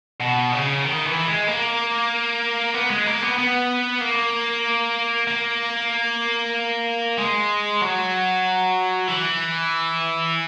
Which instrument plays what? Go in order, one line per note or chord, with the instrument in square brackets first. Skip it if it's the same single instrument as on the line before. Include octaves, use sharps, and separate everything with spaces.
[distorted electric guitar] B2
C#3
D#3
E3
G#3
A#3
B3
G#3
A#3
B3
B3
A#3
A#3
G#3
F#3
E3